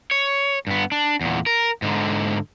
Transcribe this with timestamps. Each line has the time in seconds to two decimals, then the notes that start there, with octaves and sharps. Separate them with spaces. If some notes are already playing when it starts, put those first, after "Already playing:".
0.11 C#5
0.67 G2 B3
0.92 D4
1.21 E2 A#2
1.46 A#4
1.82 G#2 D3